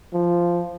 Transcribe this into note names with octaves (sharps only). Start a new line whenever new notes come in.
F3